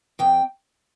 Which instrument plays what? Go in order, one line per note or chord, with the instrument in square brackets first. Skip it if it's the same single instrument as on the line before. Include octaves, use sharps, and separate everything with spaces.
[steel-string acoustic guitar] F2 G5